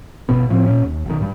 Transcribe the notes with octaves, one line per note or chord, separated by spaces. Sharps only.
G1 B2 B3
A2 F3 C4
A#2 C#4
D#2
B1 D#3
G2 G3